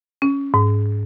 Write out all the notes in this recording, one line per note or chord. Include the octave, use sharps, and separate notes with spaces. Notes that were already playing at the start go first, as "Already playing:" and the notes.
C#4
G#2